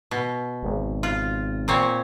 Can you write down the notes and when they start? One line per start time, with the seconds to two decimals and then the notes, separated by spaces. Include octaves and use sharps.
0.11 B2
0.63 G#1
1.03 F4
1.68 A#2 C4 C#5